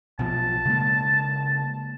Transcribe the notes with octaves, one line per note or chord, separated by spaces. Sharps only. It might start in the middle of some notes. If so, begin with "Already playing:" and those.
B1 B2 F3 A5
C#3 G#3 A#3